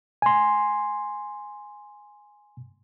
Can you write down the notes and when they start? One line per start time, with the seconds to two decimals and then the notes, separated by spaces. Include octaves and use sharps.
0.22 G#5 C6